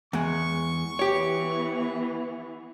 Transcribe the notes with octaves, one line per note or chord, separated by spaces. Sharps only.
E2 G#3 C#6
E3 B3 G4 C#5